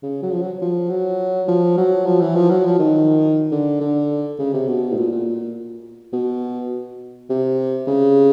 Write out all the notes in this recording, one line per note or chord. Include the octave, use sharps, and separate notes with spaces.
C#3
F#3
F3
F#3
F3
F#3
F3
F#3
F3
E3
F3
F#3
F3
D#3
D3
D3
C#3
C3
B2
A2
A#2
A#2
B2
C3
C#3